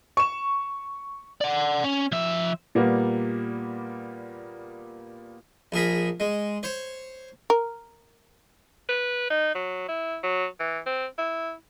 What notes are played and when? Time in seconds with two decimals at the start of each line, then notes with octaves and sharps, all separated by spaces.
0.17 C#6 E7
1.41 D5 F#5
1.84 C#4
2.12 F3 E5
2.75 A#2 G3 A#3 B3
5.72 A#1 G#4 A#4 B5
6.20 G#3
6.63 C5 C#5
7.50 A#4
8.89 B4
9.30 D#4
9.55 F#3
9.88 E4
10.23 F#3
10.60 E3
10.86 C4
11.18 E4